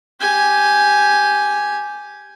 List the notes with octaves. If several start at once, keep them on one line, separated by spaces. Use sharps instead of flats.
G4 G#5